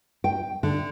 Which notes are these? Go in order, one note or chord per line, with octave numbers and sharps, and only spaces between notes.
G5
D3